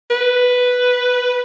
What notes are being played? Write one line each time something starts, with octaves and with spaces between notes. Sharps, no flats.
B4